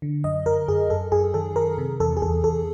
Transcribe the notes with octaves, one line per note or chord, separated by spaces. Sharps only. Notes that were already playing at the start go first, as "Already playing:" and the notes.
D3
F#2 D#5
F#2 A#4
F#2 G#4
F#2 A4
F#2 G#4
D#3 A4
F#2 A#4
C3
E2 A4
G#4
E2 A4
E2 A4